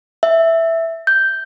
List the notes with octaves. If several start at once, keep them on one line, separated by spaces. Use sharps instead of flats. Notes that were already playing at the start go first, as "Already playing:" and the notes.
E5
G6